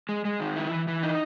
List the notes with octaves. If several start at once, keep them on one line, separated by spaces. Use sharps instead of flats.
G#3
G#3
D#3
E4
E3
E3
D#4